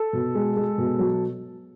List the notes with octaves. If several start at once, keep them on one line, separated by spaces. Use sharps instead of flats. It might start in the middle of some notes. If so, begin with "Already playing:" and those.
Already playing: A4
B2
G#3
G#3
B2
F#3